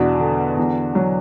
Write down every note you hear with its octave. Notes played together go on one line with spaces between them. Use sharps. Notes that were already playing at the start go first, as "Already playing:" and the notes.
Already playing: E2 B2 D4 F#4
D3
E2
F#3